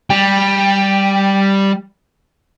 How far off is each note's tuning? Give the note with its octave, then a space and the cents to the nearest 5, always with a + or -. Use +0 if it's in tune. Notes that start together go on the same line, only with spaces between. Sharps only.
G3 +0 G5 +20